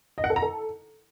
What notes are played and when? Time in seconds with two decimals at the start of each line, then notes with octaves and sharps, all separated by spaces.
0.18 D#5
0.24 F#5
0.30 A4
0.36 A#5
0.42 A4